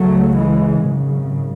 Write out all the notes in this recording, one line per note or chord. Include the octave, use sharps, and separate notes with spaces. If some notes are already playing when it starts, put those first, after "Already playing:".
Already playing: C#2 C#3 F#3 A3
E3 G#3
G#1 F#2 C#3